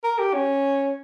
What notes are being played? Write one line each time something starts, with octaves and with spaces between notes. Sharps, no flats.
A#4
G4
C#4